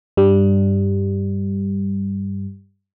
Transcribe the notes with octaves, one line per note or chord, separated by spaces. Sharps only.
G2 G3